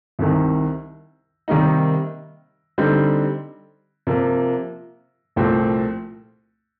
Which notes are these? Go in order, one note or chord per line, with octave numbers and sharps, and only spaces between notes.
C2 C3 D#3
C3 D#3 G3 A#3 D#4
D3 G3 C4 D#4
C3 F3 A#3
C2 A#2 F3 A3 C4